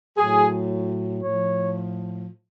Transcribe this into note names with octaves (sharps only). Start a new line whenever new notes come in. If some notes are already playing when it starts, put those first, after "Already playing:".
A2 F#3 G#4
A2 F3 C#5